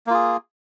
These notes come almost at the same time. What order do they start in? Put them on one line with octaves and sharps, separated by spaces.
A#3 F4 G#4